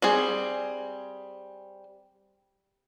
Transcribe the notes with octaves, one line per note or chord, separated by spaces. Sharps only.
G3 C4 G#4